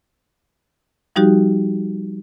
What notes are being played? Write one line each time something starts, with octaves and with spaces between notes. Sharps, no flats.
F3 G3 D#4 F#4 G4